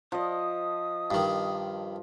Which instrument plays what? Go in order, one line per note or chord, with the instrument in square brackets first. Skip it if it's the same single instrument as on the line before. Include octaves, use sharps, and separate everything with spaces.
[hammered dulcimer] F3 D#5 [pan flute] D#6
[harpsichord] G2 D#3